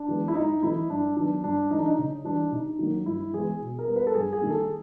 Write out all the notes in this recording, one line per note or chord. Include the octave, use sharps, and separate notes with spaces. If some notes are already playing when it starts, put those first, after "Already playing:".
Already playing: D4
E3 G#3 B3
E4
G#2 D#4
E3 A3 C4 E4
G2 D4
D#3 F#3 B3 D4
G2 D4
E3 A3 D4 D#4
D#4
C#3
E3 G3 D4
C3 D#4
D#3 F#3 A#3
G2 E4
E3 G#3 B3 G#4
B2
A#4
G3 B3
B4
A4
G2 G#4
G#4
D#3 G3 A#3
A4